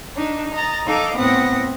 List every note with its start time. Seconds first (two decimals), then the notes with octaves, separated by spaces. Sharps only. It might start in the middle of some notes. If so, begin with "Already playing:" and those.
0.16 D4 D#4
0.54 D#5 A#5 A6
0.86 D#4 A4 D#5 F5 D6
1.17 A2 B3 C4 F#5 D#6 A#6